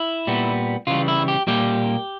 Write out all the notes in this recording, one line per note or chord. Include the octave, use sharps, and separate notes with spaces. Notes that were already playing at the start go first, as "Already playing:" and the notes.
Already playing: E4
A#2 G3 B3
C#3 E3 G3 F4
E4
G4
A#2 G3 A#3 G4